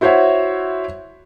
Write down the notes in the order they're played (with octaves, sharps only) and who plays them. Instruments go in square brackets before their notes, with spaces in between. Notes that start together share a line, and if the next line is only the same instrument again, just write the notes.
[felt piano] E4 F#4 C5 C#5 E5 F#5